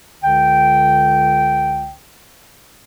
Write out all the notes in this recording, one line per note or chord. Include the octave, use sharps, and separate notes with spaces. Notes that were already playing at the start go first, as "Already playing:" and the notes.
C#2 D3 G5